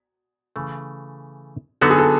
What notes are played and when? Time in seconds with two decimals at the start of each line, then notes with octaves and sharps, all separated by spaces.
0.56 C#3 E3 A3
1.81 D3 F#3 B3 D#4 F#4 A4
1.90 G#4
1.98 A4